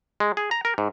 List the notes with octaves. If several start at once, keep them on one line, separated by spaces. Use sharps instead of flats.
G#3
G#4
A#5
A#4
G#2